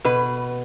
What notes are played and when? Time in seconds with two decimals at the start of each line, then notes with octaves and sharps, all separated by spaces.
0.05 B2 B4